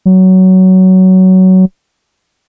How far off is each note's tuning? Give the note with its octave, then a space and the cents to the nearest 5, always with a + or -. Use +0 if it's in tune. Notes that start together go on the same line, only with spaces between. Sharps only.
F#3 +15